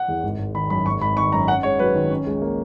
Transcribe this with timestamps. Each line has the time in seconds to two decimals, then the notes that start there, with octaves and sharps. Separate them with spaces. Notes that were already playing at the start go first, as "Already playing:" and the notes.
Already playing: F#5
0.08 E2
0.23 G#1
0.39 G#1
0.54 D#3 B5
0.70 F#2 B5
0.85 G#1 C#6
1.01 G#1 B5
1.17 D#3 C#6
1.32 F#2 A#5
1.48 C#4 F#5
1.63 G#2 C#5
1.79 F#3 B4
1.95 D#3
2.10 C#4
2.26 C#2
2.41 A#3